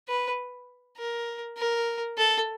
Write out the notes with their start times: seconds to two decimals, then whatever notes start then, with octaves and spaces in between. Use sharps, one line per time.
0.08 B4
0.98 A#4
1.58 A#4
2.18 A4